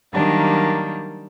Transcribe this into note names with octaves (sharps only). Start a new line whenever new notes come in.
D#3 F#3 G3 A#3 D4